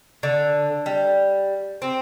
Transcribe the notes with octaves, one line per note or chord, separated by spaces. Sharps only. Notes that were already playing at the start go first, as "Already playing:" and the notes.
D3
G3
C4